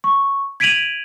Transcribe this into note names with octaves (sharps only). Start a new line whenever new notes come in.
C#6
G#6 B6 D7 D#7 F7 F#7